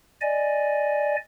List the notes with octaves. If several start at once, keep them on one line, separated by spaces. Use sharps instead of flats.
D5 D#5 G#5